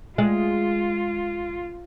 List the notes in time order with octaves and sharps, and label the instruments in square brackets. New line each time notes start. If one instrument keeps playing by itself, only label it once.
[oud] G#3 [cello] F4